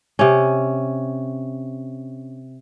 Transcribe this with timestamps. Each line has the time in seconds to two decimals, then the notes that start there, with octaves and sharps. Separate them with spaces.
0.19 C3 C#4